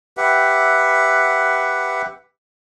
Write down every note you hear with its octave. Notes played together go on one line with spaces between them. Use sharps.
G4 B4 E5 F#5